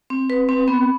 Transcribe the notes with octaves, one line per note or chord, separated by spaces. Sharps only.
C4
B4
C4
B3